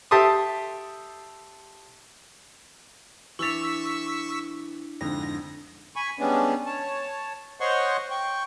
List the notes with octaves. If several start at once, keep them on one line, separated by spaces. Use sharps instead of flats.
G4 A4 E5 A5 C6 D#6
E3 D4 E4 C#6 E6 A6 B6
F2 G#2 D3 A#6
G#5 B5 C#6
G3 G#3 B3 C#4 D4
C#5 A5
C5 C#5 D#5 F#5 C6 C#6
G5 C#6